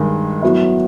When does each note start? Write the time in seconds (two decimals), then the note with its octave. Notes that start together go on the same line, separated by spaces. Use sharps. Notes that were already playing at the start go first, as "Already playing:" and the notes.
Already playing: G2 D#3 G#3
0.42 A2 F#3 B3 E4